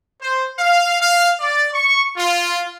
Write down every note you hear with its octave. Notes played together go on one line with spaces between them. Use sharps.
C5
F5
F5
D5
C#6
F4